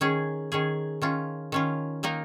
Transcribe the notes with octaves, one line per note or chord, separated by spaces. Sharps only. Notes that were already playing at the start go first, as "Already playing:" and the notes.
D#3 C#4 G#4
D#3 C#4 G#4
D#3 C#4 F4
D#3 C#4 F4
D#3 A#3 D#4 A#4